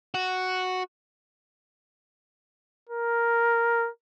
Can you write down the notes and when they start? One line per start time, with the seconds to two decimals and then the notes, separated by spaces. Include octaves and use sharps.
0.14 F#4
2.89 A#4